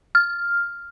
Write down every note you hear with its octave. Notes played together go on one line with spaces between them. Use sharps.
F6